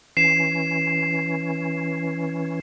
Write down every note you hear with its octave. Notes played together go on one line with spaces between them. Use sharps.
E3 C#4 C7 E7